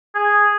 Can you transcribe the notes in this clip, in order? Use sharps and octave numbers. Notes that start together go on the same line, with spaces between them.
G#4